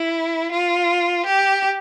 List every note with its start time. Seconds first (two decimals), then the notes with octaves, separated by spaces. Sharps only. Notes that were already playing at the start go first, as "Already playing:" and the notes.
Already playing: E4
0.52 F4
1.26 G4